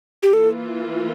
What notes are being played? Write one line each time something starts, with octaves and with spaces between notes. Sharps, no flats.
G4
E3 A#3 F4 A4